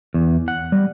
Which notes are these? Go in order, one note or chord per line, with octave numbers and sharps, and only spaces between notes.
E2
F#5
G3